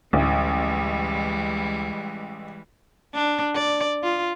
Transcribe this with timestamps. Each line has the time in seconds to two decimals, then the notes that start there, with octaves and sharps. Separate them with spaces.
0.13 A1 D2 E3 G3 G#3
3.14 D4
3.55 D5
4.03 F4